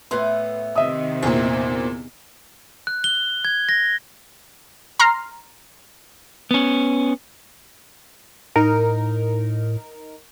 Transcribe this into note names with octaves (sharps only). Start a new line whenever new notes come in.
A2 A3 B3 B4 C6
C3 D#3 D#5 E5 D#6
E2 A#2 C4 D#4
F#6
G7
G#6
A#6
A#5 C6 F6 C7
B3 C#4
A2 D#4 A#4